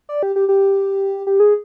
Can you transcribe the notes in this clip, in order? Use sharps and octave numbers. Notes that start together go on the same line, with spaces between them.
D5
G4
G4
G4
G4
G#4